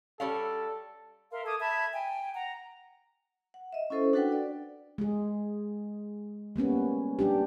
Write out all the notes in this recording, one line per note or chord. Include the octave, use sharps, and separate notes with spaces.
G3 C#4 A4 F5
A#4 E5 F5 C6
A4 D6 D#6 G#6
E5 A5 B5 G#6
G5 G#5
F#5 A#5
F#5
D#5 E5
C#4 E4 A4 C5
D4 F#4 A4 B4 F#5 G5
D5
G#3 G#4
G3 A#3 B3 C#4
G3 D4 G4